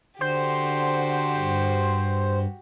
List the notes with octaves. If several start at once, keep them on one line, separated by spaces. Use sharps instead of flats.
D3 F#4 G4 C5
G2